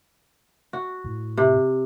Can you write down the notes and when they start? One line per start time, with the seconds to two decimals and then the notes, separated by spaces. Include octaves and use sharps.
0.73 F#4
1.04 A2
1.37 C3